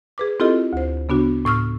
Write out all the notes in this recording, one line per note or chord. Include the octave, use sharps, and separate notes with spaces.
G#4 B4 D6
C4 E4 F4 G4 A4 D#5
D2 C5
C#3 B3 D4 F#4
A2 C#6 E6 F6